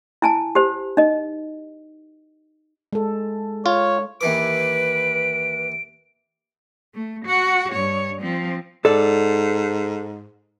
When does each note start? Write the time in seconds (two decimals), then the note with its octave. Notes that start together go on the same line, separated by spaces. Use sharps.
0.22 E4 G#5 A5
0.55 G4 C5
0.97 D#4 D#5
2.93 G#3 A4
3.66 F4 C#5
4.21 D#2 E3 B4 D6 D7
6.94 A3
7.26 F#4 F#5
7.72 G2 C#5
8.22 F3 C4
8.85 G#2 A4 D5